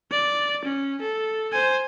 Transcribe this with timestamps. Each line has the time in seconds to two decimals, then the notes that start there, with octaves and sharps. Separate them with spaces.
0.11 D5
0.64 C#4
1.01 A4
1.53 C5 G#5